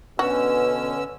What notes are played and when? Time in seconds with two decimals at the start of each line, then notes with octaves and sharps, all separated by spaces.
0.19 B2 D3 C#4 F#4 B4 E6